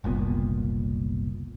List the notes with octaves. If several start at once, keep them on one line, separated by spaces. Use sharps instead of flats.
F#1 C2 A#2 B3